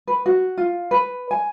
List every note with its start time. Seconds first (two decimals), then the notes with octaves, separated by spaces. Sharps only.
0.08 B4
0.26 F#4
0.57 F4
0.91 B4
1.31 G#5